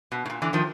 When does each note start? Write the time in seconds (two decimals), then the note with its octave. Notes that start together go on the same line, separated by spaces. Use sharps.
0.12 B2
0.26 A2
0.30 A#2
0.42 D3 E3
0.53 D#3 F3